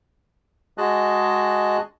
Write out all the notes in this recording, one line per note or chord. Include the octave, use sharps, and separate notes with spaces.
G#3 F#4 G#4 D#5 A5 F#6